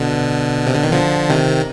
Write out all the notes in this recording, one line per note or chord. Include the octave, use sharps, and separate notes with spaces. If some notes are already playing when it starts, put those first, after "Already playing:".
Already playing: B2 D3
C3
D3
D#3
D3 F3
C3 D#3